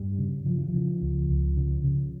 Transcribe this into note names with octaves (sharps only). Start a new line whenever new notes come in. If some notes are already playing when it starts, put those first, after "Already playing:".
Already playing: G2 G3
C#3
C#3 F3
E3
F3
C#3
C#2
C#2
C#3
C#3